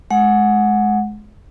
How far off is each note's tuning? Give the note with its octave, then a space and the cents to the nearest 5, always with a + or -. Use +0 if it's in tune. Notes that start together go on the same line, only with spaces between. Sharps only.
G#3 +25 F#5 -10